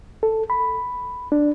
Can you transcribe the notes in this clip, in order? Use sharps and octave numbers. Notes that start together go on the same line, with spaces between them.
A4
B5
D4